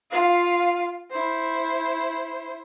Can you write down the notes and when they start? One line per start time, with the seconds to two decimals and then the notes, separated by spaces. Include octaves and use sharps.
0.10 F4 F5
1.11 E4 C5